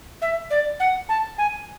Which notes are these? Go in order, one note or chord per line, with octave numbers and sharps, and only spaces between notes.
E5
D5
F#5
A5
G#5